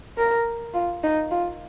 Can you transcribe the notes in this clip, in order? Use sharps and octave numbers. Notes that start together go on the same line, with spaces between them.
A#4
F4
D#4
F4